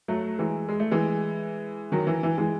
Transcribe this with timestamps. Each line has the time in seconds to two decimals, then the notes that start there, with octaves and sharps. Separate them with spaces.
0.08 F#3 A3
0.39 E3 G#3
0.69 G#3
0.80 A3
0.91 E3 G#3
1.92 D#3 F#3
2.07 E3
2.23 E3
2.38 E3 G#3